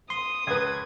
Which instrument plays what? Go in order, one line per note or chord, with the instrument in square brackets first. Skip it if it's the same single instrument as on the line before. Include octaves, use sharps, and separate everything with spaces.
[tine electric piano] C6 [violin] D#6
[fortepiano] C#2 B4 [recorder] G#6